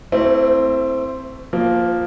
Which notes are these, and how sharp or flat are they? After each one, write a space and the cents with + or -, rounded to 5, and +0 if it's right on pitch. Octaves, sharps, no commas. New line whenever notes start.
A3 +30 C4 +0 E4 +0
F3 +0 A#3 +0